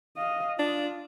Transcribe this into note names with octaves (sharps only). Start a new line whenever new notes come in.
D#5 F5
D4 F4